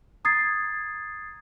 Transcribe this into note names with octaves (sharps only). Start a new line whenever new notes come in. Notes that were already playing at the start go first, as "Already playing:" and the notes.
A#5 D#6 G#6 A6 C7